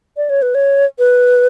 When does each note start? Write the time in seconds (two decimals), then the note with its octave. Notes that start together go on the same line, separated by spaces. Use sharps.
0.17 D5
0.30 C#5
0.42 B4
0.55 C#5
0.99 B4